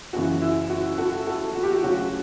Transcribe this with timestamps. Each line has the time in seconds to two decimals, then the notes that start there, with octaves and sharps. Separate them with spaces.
0.13 F#1 F#2 C#3 E3 F#4
0.42 E4
0.70 F#4
0.98 F#4 A4
1.27 F#4 A4
1.55 F#4
1.63 G4
1.71 F#4
1.83 D2 C#3 F#3 C#4 F#4